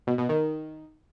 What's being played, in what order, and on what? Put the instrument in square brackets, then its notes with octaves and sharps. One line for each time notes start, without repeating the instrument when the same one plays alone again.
[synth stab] B2
B2
D#3